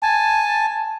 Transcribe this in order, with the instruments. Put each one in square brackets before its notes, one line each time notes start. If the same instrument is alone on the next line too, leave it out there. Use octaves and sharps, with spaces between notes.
[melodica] G#5 A5